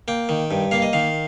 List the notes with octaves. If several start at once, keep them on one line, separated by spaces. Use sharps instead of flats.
A#3 G5
D#3
G2
A#3 F5
D#5
D#3 F5